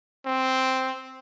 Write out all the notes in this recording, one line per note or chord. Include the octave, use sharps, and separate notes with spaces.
C4